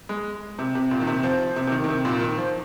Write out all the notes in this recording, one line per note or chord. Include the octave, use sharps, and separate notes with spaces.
G#3
C3
C3
A#2
D#3
C3
F3
C3
C3
D#3
D#3
C3
A#2
D#3
F3